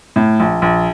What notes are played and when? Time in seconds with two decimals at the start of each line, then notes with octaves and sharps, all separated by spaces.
0.16 A2
0.40 A#1
0.62 A#1